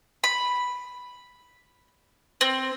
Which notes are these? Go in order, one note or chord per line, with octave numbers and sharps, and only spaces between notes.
B5
C4